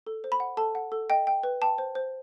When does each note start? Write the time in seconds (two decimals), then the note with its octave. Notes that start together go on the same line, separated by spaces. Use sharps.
0.07 A4
0.24 C5
0.32 B5
0.40 F#5
0.57 A4 A5
0.75 F#5
0.92 A4
1.10 D#5 G5
1.27 G5
1.43 B4
1.62 G5 A5
1.78 C5
1.95 C5